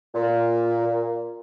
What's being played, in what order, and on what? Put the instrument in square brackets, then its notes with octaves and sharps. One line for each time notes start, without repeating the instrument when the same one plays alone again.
[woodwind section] A#2